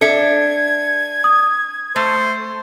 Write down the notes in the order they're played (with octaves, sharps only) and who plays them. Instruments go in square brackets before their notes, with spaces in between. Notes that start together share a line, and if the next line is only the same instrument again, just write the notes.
[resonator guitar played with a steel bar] D4 E5 [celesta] A4 C#7 [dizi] G#6
[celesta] D#6
[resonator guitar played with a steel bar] A3 [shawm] C5